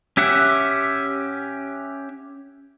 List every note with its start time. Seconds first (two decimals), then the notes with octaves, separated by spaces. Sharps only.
0.17 C#4 G4 E5 F#5